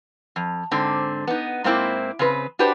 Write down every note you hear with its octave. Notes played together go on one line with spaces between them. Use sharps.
F2
G#2 D3 C4
B3 D#4
G#2 A#3 C4 E4
C#3 C4 B4
D4 F#4 G4 B4 C5 D5